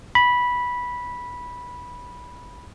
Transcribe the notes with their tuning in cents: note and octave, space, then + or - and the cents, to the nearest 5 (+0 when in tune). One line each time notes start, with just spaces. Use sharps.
B5 -10